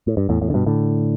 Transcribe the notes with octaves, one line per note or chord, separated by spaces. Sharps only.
A2
G2
E2 A2
E2 A2
D3
G2 B2
A2 D3